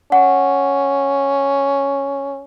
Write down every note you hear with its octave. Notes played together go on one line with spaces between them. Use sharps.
C#4 F#5